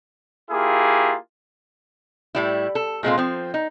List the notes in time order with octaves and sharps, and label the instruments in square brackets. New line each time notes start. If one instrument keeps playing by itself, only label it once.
[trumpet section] A#3 E4 F4 G4 G#4
[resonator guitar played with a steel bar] A2 G3 E4
A4
A#2 G#3 C4 F4
F3 C4
D#4